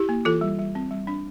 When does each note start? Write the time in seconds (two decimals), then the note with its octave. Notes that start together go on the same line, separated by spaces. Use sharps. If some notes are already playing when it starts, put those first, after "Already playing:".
Already playing: E4 G4
0.09 A#3
0.25 E3 F4 A4
0.41 G3
0.59 G3
0.75 C4
0.91 G3
1.07 D4